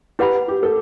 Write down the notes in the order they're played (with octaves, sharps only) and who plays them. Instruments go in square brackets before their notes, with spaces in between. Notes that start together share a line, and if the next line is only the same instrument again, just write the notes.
[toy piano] E4 B4 F#5 B5 [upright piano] G4
[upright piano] G4
A4